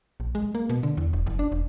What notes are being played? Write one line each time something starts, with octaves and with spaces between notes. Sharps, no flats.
A#1
G#3
A#3
B2
D3
E2
E1
F#1
D4
E1